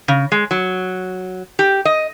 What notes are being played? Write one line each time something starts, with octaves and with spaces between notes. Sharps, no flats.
C#3
G#3
F#3
G4
D#5